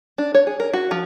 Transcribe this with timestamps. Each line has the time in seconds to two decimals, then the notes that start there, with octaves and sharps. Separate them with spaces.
0.18 D4
0.35 C#5
0.47 G#4
0.60 A#4
0.74 F#4
0.91 F3